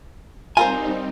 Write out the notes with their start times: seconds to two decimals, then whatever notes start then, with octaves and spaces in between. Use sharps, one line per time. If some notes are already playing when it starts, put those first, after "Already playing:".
0.57 G3 C4 D#4 F4 A#4 C5 G#5